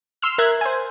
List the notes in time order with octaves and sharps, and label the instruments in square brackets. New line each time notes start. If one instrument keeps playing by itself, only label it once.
[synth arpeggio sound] C6 E6 F6
A#4 E5 F#6 G#6
C5 G#5